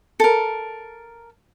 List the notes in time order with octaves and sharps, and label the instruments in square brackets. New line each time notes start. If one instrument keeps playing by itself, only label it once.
[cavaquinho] A4 A#4